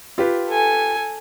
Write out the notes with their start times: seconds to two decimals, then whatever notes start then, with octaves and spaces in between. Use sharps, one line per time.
0.18 F4 G4 B4
0.48 A4 G#5